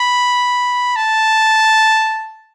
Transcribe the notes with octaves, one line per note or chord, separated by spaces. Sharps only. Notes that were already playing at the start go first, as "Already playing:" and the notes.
Already playing: B5
A5